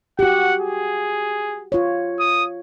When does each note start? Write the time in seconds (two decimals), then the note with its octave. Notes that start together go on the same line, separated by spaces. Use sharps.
0.19 F#4 G4 F#5
0.60 G#4
1.72 F4 C#5
2.20 D#6